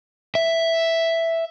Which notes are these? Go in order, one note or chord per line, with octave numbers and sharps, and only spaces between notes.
E5